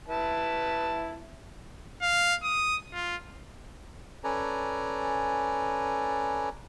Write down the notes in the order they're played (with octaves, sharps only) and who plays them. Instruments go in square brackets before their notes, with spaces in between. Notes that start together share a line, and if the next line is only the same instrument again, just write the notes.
[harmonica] E4 B4 A5
[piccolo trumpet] F5
D#6
F4
[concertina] C#4 A4 B4 D5 G#5 A#5